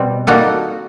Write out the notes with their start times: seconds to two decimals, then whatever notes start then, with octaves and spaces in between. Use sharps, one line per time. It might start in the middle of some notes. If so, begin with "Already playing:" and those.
Already playing: B2 G3 C4
0.27 G3 A#3 D#4 F#4 A4